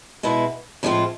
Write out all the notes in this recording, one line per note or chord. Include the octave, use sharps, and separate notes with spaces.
B2 G#3 B3 E4
A2 F3 G#3 C4 F4